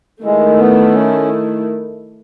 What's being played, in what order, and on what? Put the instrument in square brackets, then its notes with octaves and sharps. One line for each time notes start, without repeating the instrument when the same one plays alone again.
[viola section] D#3 A3 E4 [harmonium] G#3
[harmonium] B3
C#4